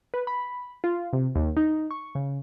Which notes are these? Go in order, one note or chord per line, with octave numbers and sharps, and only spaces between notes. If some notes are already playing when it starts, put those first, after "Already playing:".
B4
B5
F4
C3
D#2
D#4
C#6
C#3